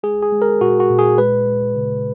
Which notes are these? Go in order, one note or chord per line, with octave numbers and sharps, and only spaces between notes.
G#3 G#4
G#4
G#3
A#4
A#2 F#4
F#4
A#2
G#4
G#3 B4
G#3
C#3